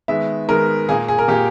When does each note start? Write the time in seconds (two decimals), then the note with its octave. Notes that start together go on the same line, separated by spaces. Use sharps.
0.08 D#3 G#3 B3 E5
0.48 D#3 G#3 B3 A#4
0.89 A#2 A#3 G#4
1.08 G#4
1.19 A#4
1.28 A#2 A#3 G4